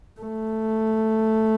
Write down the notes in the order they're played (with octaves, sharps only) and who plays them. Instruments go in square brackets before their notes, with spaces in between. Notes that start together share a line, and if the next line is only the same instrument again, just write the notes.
[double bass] A3